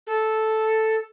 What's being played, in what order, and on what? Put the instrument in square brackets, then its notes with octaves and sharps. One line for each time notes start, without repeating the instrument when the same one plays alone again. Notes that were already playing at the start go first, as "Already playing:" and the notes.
[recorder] A4